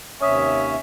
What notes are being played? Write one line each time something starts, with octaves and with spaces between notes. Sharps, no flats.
D#2 C3 C#4 C#5 E5 D#6